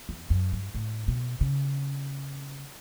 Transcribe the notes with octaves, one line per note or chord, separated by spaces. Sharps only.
E2
F#2
G2
A2
B2
C#3